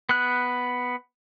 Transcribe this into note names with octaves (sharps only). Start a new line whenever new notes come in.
B3 F#6